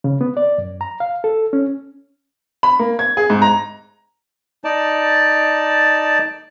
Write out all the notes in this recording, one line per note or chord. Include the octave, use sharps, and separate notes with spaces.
C#3
B3
D5
F#2
A#5
F5
A4
C#4
B5
A#3
G#6
G#4
G#2
A#5
D#4 D5 A5